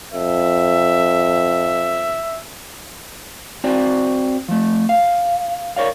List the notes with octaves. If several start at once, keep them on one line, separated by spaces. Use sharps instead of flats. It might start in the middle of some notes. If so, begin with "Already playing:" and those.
F2 E5
C4 F#4 C5 D5
F3 A3
F5
A#4 C#5 D5 F5